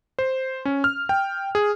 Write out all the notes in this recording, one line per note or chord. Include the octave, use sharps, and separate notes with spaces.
C5
C#4
F6
G5
G#4